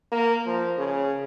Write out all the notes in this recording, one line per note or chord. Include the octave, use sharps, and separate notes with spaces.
A#3
F3
C#3